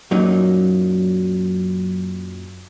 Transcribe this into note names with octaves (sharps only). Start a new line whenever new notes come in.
F#2 A#2 F#3 C#4 D#4